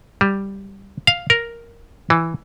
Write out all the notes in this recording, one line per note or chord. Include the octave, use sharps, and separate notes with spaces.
G3
F5
A#4
E3